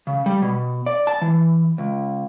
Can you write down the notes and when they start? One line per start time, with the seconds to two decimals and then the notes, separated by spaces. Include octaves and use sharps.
0.07 C#3
0.26 G3
0.42 B2
0.86 D5
1.07 A5
1.21 E3
1.78 C#2